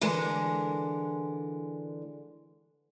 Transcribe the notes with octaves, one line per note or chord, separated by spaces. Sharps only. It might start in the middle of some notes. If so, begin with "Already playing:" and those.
D3 E3 G#3 A#4